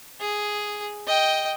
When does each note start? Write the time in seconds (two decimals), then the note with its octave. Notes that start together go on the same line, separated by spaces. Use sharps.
0.20 G#4
1.07 D#5 G5